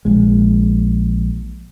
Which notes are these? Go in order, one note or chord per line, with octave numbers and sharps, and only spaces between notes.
A#1 G#3